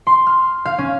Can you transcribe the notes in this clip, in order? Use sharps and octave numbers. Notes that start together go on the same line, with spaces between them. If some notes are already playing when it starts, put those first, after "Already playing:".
C6
F6
F5
C#4